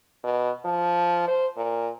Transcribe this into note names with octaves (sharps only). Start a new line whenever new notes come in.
B2
F3
C5
A#2